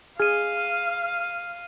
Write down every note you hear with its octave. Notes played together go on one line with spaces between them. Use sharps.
G#4 F5 G#5 F6 D#7